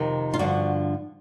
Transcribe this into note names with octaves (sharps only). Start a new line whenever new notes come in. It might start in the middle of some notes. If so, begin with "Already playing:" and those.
Already playing: F2 C3 D#3
F4
G2 D3 F3 F#4